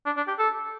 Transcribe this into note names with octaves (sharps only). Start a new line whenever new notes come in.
D4
D4
G4
A4